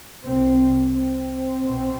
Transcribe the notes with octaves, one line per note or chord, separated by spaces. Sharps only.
C2 C3 C4
C4
B1 B2